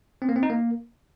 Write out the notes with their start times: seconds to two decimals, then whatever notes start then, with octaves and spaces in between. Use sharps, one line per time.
0.22 C4
0.29 A#3
0.36 C4
0.43 D#4
0.50 A#3